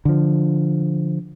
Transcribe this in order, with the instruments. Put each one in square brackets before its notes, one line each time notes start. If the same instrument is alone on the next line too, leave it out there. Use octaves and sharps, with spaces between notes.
[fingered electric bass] D3 F3